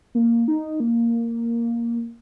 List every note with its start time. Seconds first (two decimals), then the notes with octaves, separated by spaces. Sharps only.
0.15 A#3
0.48 D#4
0.80 A#3